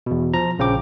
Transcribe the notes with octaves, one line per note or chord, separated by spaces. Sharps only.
E2 B2
F3 A#5
A#1 C#3 F3 G5 D6